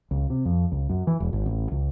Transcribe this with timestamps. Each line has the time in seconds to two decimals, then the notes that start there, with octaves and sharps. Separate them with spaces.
0.11 C#2
0.30 C3
0.45 F2
0.72 C#2
0.90 F#2
1.07 E3
1.20 E1
1.33 G#1
1.46 A1
1.72 C#2